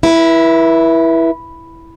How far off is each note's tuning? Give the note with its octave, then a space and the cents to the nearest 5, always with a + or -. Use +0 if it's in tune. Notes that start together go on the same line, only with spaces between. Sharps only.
E4 +0 B4 -35